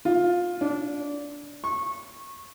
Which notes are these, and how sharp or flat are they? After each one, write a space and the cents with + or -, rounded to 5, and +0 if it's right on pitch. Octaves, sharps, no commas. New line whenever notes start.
F4 +15
D4 -20
C#6 -20